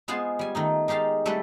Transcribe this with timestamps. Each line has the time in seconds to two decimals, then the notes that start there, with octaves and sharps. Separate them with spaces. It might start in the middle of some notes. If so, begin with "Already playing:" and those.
0.08 G#3 B3 F4 G#4 C5
0.39 G3 G#5
0.55 D#3 A3 D#4
0.88 G#3 D#4 G4 F5 A5
1.26 G3 A3 E4 A4 B4